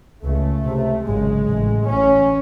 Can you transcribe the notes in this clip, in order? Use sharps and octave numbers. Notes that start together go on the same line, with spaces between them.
C#2 C#3 A3
C3
C#2
G#1 F#2 C#3 G#3
A1 A2
A1 A2 C#4